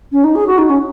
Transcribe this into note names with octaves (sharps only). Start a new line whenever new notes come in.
C#4
D#4
G#4
F#4
D#4
C#4